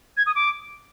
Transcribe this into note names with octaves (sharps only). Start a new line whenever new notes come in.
G#6
D#6
D6